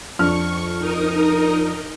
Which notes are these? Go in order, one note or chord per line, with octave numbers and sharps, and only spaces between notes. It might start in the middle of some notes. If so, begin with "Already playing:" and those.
F2 D4 C#6 F6
D#4 A#4 D#5